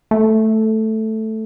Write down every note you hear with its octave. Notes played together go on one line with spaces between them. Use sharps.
A3